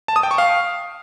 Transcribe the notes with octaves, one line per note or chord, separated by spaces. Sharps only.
A5
D#6
G5
C#6
F5